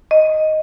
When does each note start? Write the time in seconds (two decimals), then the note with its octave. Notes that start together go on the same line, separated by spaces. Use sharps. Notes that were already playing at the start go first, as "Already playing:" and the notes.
0.11 D#5